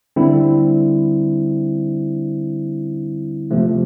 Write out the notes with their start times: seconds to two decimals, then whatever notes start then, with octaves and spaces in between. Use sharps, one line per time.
0.16 D3 G3 C4 E4
3.51 C3 F3 A3